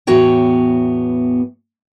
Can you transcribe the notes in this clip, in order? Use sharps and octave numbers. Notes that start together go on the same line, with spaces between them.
E2 A2 B3 F#4 C#5 G5